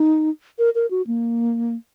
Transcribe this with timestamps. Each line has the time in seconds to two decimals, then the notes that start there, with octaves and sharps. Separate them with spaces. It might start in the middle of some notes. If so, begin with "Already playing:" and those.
Already playing: D#4
0.58 A#4
0.75 A#4
0.91 F#4
1.07 A#3